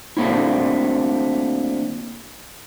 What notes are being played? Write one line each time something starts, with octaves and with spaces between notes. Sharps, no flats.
D3 F#3 A3 A#3 C4 E4